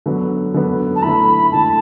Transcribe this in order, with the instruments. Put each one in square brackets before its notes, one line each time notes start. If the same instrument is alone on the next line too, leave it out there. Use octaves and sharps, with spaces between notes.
[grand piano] D3 F#3 B3
D3 F#3 B3
[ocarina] A5
[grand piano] D3 A3 E4 [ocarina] B5
[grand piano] D3 A3 E4 [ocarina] A5